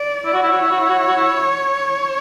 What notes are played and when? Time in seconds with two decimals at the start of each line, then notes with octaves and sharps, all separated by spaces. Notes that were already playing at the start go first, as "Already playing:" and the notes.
Already playing: D5
0.25 E4
0.34 F#4
0.43 E4
0.50 F#4 C#5
0.61 E4
0.71 F#4
0.80 E4
0.90 F#4
0.98 E4
1.08 F#4
1.17 E4